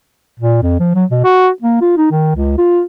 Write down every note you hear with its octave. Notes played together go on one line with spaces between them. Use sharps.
A#2
F2
F3
F#3
B2
F#4
A#3
F4
D#4
D#3
C#2
F4